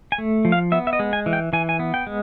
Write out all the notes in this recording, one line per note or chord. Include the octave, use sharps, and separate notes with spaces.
G#5
A3
F3
F5
B3 E5
E5
D#5
G#3
G#5
E3
G5
E3 G#5
G#5
B3
G5
G#3